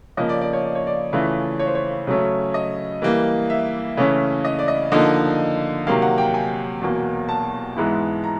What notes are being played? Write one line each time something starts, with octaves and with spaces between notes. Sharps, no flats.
C#3 F3 A#3 D#5
D5
D5
C#5
D5
C#5
D5
C#3 E3 A3 C#4 F4
C#5
C5
C#5
C#3 F#3 A3 C#4
D#5
E3 G3 A#3
E5
C#3 E3 A3 C#4
D#5
D5
D#5
D3 F3 A#3 D#4 D#5
C3 D#3 F#3 A#3 F5
F#5
G5
G#5
E2 B2 F#3 A#3
A5
G#2 E3 G#3 B3 E4
A#5